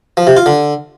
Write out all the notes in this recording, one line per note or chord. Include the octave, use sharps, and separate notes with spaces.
F3
C3
F4
D3